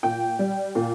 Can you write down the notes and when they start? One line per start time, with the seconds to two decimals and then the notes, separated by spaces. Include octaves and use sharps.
0.03 A#2 G5
0.39 G3
0.75 A#2